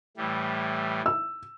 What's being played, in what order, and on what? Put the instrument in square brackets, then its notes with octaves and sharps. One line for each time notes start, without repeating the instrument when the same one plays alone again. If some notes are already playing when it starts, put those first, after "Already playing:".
[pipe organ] A2 E3 G3
[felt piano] E6